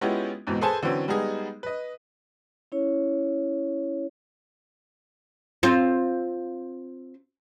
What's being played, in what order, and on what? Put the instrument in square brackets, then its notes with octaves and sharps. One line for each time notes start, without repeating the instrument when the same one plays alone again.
[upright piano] G#3 B3 C#4 E4 F4 G4
E2 G#2 B2 E3 C4
G#4 A4 B4 C5 G#5 A5
D3 E3 F#3 C4 C#4
G3 G#3 B3 D#4 G#4
B4 D#5
[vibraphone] C#4 E4 C#5
[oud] C4 F4